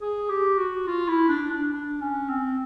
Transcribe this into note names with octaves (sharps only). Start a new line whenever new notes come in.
G#4
G4
F#4
F4
E4
D4
D4
D4
C#4
C4